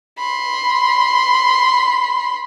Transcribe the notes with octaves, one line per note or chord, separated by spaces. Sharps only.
B5 C6